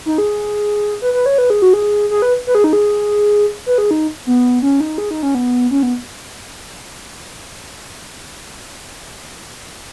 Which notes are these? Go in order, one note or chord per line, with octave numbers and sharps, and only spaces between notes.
D#4
G#4
B4
B4
C#5
B4
G#4
F#4
G#4
G#4
B4
B4
G#4
D#4
G#4
B4
G#4
D#4
B3
C#4
D#4
G#4
D#4
C#4
B3
C#4
B3